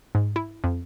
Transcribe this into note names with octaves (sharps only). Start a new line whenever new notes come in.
G#2
E4
F2